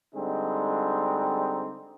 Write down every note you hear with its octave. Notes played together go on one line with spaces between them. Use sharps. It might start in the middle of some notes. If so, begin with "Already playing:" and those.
D3 G3 G#3 C4 D#4